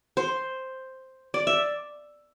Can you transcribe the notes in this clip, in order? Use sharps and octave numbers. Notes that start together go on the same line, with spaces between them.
C5
D5
E5